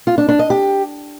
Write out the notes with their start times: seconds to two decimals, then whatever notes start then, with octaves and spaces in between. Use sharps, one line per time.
0.07 F4
0.18 D4
0.29 D4
0.39 D#5
0.50 G4